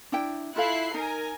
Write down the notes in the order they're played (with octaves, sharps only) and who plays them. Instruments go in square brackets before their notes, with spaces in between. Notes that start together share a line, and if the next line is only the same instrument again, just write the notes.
[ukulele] D4 E4 G5
[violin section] E4 F#6 C7 [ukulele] F4 A4 F5
[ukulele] D#4 [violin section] A#4 G#5